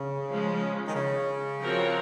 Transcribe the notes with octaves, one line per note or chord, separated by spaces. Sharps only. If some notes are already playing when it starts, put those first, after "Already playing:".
Already playing: C#3
F3 G#3 C#4
D#3
C#3
F3 C4 F#4 A#4 C#5